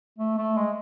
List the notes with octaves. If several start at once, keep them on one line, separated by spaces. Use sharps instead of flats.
A3
A3
G#3